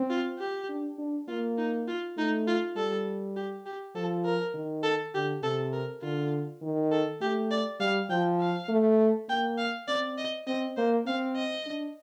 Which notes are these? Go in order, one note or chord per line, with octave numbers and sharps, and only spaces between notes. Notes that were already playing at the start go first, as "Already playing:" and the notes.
Already playing: C4
F4
G4
D4
D4
A#3 F4
D#4
F4
A3 D#4
F4
G3 A4
G4
G4
F3 A4
A#4
D#3
A4
D3 G4
C3 A4
A#4
D3 F4
D#3
A4
A3 G4
D5
G3 F5
F3 G5
F5
A3
A#3 G5
F5
C4 D5
D#5
C4 D#5
A#3 C5
C4 F5
D#5
D4